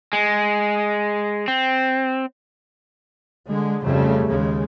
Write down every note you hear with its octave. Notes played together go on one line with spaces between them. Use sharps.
G#3
C4
D3 G#3
F2 C#3 G3 A3
D#2 C#3 G#3